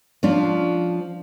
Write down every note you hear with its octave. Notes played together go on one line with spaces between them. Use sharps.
F3 C#4 D4 F4